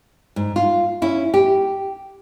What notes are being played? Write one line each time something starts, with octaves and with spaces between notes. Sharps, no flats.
G#2
F4
C#4 E4
G4